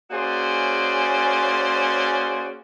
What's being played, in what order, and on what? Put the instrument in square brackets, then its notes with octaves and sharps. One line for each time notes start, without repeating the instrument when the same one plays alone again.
[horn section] A#3 C#4 F#4 G#4 C5 D5